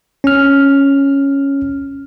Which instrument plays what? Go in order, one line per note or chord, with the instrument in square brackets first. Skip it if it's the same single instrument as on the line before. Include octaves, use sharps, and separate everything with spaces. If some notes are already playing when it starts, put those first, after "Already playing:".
[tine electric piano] C#4 F6